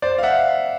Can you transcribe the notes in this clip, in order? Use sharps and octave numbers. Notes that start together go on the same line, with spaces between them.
C5 D5
F5
E5 F#5